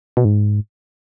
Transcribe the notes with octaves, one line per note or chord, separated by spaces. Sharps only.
B2
G#2